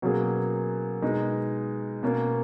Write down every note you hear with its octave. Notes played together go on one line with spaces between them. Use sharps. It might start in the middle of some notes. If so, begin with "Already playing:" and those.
B2 F#3 A#3 C#4 G#4
B2 G#3 D#4 G#4
B2 A#3 C#4